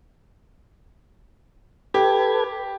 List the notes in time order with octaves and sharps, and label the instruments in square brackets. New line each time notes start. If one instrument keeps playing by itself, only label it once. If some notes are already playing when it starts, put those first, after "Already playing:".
[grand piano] G4 [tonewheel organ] A4 B4 G#6